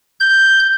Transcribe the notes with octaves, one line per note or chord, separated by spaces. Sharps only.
G6